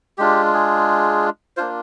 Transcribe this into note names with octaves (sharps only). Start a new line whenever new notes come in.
G#3 D4 F4 G4
G#4
A#3 D4 F4 C5